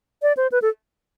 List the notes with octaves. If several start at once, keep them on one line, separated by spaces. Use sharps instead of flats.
D5
C5
B4
A4